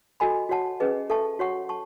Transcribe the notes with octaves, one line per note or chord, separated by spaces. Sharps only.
F#4 A4 D#5 G#5 B5
F#4 C#5 F#5 A5
C#4 G#4 B4 D#5
A4 E5 A5 C#6
F#4 C#5 F#5 C#6
A5 C#6